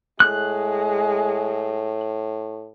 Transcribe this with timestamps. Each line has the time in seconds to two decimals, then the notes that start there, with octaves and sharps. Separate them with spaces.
0.20 A2 G#3 F#6